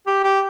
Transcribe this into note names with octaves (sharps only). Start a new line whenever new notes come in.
G4
G4